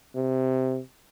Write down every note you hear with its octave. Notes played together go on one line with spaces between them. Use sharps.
C3